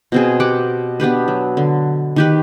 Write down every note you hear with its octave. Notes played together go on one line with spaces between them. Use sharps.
B2 C4 G#4
G4 F#5 D6
B3 D4 G4 B4
F#3
D3
D#3 G4 B4